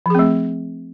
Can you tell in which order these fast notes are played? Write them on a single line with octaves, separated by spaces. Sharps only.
F3 G#4 C4 A3